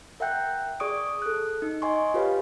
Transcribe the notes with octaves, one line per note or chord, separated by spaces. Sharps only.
A#4 E5 F#5 G5 F#6 G6
G#4 D5 C#6 D#6 D7
A4 F#6
D#4
D#5 G#5 C6 C#6
F4 G4 B4 C#5 F5